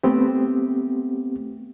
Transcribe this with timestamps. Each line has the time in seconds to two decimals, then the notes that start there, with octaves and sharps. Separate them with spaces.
0.03 A3 B3 C4 G4